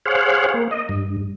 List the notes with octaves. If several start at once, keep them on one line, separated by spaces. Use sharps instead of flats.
G#4 C5 C#5 F5 F#5
A#3
D#5
G2